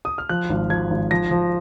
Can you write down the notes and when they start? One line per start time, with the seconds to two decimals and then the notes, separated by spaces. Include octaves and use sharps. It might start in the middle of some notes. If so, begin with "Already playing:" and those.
0.05 D#6
0.18 F6
0.29 F3 F#6
0.50 G#1
0.70 F3 G#6
0.90 G#1
1.11 F3 A#6
1.31 F3